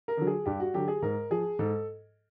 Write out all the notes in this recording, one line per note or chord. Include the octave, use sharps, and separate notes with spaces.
A#4
D3 F#3
G#4
G2 G4
F#4
D3 F#3 G4
G#4
G#2 A#4
F3 G#4
G#2 A4